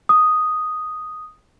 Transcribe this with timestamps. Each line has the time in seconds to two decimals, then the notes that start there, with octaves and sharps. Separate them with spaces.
0.09 D#6